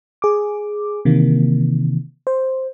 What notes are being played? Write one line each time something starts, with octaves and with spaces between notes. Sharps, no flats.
G#4 D6
C3 D#3 E3 A#3
C5